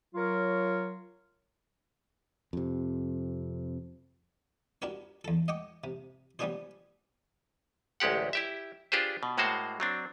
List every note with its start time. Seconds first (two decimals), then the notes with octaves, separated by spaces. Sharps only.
0.15 F#3 F4 A#4 C#5
2.53 F2 C3
4.82 D4 F#4 G4 A#4 B4
5.25 E2 A4
5.48 D#5 F#5 G5 D6
5.84 C3
6.39 G3 B3 C#4 D4 G#4 C5
8.00 A1 D2 G#3 G4 F#5
8.33 E4 G4 E5
8.92 D4 F4 G4 G#4 B4 C5
9.23 B2
9.38 A2 G#3 A#3 F#4 C5 A5
9.80 F#3 C4 D4